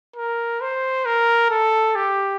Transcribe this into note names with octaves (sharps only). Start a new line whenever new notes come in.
A#4
C5
A#4
A4
G4